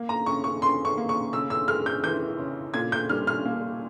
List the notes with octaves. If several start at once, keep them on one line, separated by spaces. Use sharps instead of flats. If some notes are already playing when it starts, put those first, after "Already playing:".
Already playing: A#3
A#5
C#3 C#6
C#6
C#3 C6
C#6
A#3
C#6
C#3 E6
E6
G#3 F6
G6
E3 G6
C#3
A#2 G#6
G6
G3 F6
F6
A#3